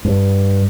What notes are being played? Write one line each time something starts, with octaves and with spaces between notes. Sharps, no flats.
G2